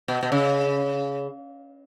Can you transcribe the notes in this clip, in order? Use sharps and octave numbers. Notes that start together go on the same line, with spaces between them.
B2
B2
C#3